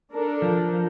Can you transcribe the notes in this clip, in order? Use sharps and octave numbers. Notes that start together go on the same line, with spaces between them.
D4 A4 A#4
F3